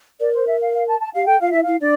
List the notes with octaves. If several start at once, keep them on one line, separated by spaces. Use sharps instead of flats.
A#4 D5
C5
E5
F5
F5
A5
A5
G4 F5
A4 G5
F4 F5
E4 E5
E4 F5
D4 D5